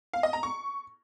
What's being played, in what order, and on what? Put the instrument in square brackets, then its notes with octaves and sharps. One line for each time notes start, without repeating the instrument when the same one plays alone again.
[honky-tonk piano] F5
D#5
A#5
C#6